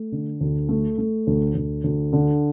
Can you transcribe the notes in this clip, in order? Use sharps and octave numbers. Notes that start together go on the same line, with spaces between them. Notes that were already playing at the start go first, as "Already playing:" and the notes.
Already playing: A3
D3
D2
A3
A3
D2
D2
D2
D3